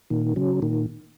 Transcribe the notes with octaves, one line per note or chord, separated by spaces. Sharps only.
A#2 D#3
C#3 F#3
A#2 D#3